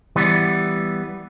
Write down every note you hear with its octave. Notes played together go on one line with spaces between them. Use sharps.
E3 G3 B3